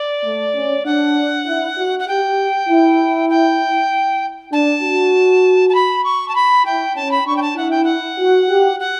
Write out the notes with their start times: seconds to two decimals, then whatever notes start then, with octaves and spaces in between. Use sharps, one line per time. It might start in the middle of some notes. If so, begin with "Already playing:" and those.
Already playing: D5
0.24 A3
0.55 C#4
0.85 D4 F#5
1.47 E4
1.77 F#4
1.99 F#5
2.07 G4 G5
2.69 E4
3.29 G5
4.52 D4 A5
4.82 F#4
5.69 A5
5.74 B5
6.04 C#6
6.28 A5
6.35 B5
6.65 E4 G5
6.95 C#4 A5
7.11 B5
7.26 D4 C#6
7.36 G5
7.41 A5
7.57 E4 F#5
7.70 G5
7.84 F#5
8.18 F#4
8.48 G4
8.79 F#5